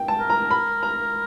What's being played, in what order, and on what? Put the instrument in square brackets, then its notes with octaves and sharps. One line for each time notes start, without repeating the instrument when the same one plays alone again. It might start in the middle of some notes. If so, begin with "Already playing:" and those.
Already playing: [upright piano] G5
A5
[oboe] A#4
[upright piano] A#5
B5
A#5